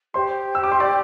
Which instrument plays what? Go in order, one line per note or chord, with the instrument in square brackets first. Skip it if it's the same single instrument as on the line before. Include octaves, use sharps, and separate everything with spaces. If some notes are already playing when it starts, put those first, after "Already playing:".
[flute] G4 [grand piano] C5 C6
[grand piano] E6
D6
C6
D5 D6